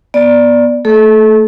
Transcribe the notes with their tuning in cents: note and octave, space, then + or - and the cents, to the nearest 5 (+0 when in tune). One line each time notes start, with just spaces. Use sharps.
B3 -20 D5 +0
A3 +10 A4 -30